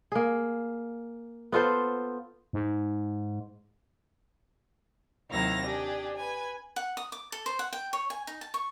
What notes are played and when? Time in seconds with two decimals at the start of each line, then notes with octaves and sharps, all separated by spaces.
0.12 A#3 G#4
1.52 B3 F4 A4 C5
2.53 G#2
5.30 D#2 C3 F#3 E4 F5 A#6
5.65 D4 G4 G#4
6.16 B4 G#5
6.76 F#5
6.97 D#6
7.12 D6
7.32 A4
7.46 C5
7.59 F#5
7.73 G5
7.93 C#5
8.10 G#5
8.27 D#4
8.41 A5
8.54 C#6